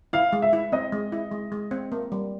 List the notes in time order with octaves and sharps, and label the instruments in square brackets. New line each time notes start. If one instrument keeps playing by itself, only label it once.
[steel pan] E4 [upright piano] F5
[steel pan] G#3
[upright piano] E5
[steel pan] E4
[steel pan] C4 [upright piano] D#5
[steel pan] G#3
E4
G#3
G#3
C4
A#3
G3